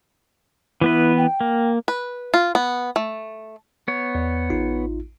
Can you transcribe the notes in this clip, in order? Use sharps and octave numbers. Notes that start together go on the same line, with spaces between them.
E3 B3 E4 B4
G5
A#3
B4
F4
B3
A3
B3 C#5
E2
A1 D#4 F4